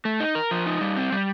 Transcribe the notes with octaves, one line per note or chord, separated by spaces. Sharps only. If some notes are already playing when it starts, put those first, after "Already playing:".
A3
D#4
A#4
F3
D#4
G3
C4
G3